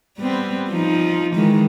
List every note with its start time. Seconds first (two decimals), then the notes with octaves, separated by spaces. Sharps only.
0.18 G3 B3 C4
0.70 F3 D#4
1.35 D#3 E3 G#3